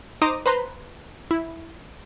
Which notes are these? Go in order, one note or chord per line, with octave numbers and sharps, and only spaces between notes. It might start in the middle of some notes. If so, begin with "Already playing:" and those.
D#4 C5 A#5 D6 D#6
B4 C5 A#5 C6
E4